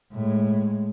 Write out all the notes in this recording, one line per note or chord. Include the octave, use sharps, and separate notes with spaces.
A2 G#3